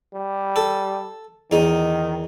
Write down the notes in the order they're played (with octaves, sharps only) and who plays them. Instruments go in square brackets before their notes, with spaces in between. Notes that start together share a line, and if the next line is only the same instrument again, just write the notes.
[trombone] G3
[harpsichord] A4
[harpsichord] E2 D#4 [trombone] D#3